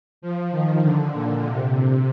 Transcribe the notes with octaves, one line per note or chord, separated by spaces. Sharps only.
F3
D#3
D3
A#2
C3
C3